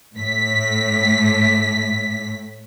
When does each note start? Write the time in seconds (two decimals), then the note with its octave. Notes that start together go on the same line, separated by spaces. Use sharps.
0.14 A2 B6